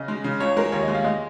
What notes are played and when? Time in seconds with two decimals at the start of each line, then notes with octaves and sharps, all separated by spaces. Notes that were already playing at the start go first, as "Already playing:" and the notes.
Already playing: C#3 D#5
0.08 G#3
0.24 C#3
0.40 C#2 C#5
0.57 G#3 A#4
0.72 D#2 C#5
0.83 D#5
0.88 G#3
0.95 F5
1.05 G#3 D#5